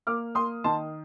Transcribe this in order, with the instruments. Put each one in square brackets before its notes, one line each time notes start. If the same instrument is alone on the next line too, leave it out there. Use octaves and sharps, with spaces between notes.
[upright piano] A#3 D6 F6
A#3 C6 D#6
D#3 A5 C6